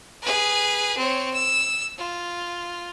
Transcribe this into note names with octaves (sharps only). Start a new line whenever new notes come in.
G#4 B4
C4 C#5
E6
F4